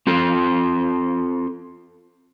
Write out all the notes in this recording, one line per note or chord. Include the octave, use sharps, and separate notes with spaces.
C4 F4 A4